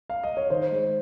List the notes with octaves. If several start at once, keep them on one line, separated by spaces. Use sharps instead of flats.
F5
D#5
C#5
D#3 C5
G#3